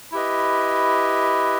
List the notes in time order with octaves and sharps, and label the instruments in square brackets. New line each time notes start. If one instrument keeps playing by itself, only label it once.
[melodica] E4 G4 B4 D#5